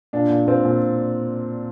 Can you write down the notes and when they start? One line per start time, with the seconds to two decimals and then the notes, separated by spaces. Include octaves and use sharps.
0.13 A#2 D4
0.30 A#2
0.47 A#2 C4
0.65 A#2